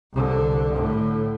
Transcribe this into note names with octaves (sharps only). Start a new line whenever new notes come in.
C2 D3
A2 D3